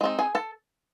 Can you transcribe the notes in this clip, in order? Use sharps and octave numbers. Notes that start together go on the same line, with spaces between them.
G#3 C4 D#4
G#4 G#5
A4 A5